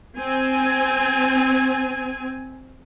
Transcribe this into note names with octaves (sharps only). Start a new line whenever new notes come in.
C4 G#5